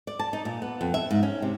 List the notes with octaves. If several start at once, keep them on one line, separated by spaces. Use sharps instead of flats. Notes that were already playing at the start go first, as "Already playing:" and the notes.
D5
A5
D#4
A#2
B3
F2
E5
G#2
C#4
C3